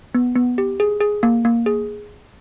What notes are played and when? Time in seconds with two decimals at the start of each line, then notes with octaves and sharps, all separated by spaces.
0.15 B3
0.35 B3
0.58 G4
0.80 G#4
1.01 G#4
1.23 A#3
1.45 A#3
1.66 G#4